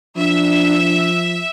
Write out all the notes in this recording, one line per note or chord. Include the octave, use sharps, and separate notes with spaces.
F3 D4 E5